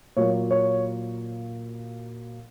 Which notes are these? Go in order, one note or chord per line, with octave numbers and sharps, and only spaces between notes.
A#2 F#3 A#3 C#5
C#5